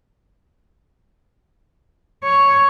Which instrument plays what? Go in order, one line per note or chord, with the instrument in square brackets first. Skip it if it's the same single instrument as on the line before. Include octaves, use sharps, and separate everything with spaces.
[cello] C#5